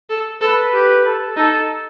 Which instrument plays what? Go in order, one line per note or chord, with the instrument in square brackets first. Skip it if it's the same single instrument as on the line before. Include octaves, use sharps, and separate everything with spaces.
[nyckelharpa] A4
[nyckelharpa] A4 [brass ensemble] B4
[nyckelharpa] G4
[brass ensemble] A4
[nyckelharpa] D#4 [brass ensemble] A4